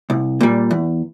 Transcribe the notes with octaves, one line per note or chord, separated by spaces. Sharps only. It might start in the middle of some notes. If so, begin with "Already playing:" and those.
C2
A#2 G3
E2